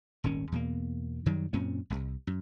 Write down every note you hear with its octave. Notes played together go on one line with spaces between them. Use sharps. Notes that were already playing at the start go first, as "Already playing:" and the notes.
D#1 G#1 D#3 C#4
E2 B2 A#3
F#2 D#3 F#3 G3
F#2 A#2 C4 C#4
D1 C2
F#2